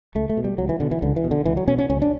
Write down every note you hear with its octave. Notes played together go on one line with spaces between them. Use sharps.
C#2 A3
A3
B2
G3
C#2 F#3
E3
B2 D3
E3
C#2 D3
E3
B2
D3
C#2 E3
F#3
B2 C#4
C#4
C#2 C#4
D4